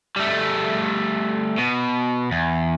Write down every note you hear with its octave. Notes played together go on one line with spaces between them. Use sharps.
G3 A3
B2
E2